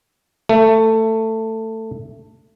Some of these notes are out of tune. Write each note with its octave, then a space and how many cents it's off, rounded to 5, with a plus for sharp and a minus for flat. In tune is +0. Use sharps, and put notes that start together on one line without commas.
A3 +15